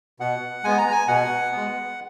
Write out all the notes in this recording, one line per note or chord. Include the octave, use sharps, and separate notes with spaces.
B2 F#5
G#3 B3 G#5
A#5
G#5
B2 F#5
G#3 B3